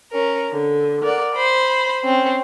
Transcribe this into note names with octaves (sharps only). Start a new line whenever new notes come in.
C#4 A#4
D3
A#4 D5 F#5
C5 B5
C4 C#4